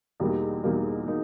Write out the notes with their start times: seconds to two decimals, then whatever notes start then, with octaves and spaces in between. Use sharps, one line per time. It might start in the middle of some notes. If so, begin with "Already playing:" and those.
0.20 E2 B2 G3 A#3 D#4
0.64 E2 B2 G3 A#3 D#4
1.08 A#3 D#4